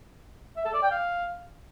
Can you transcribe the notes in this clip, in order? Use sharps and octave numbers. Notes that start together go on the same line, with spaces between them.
E5
A4
D5
G5
F5